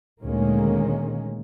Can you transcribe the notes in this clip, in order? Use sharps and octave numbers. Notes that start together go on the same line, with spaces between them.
D2 A#2 D#3 G#3 A#3 C#4